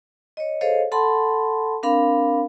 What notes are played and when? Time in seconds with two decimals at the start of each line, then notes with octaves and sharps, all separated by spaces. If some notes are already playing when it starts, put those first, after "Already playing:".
0.37 C#5 D#5
0.61 G#4 A4 C5 C#5 D#5 F5
0.92 A4 F#5 A5 B5 C6
1.83 C4 D4 A#4 F5 B5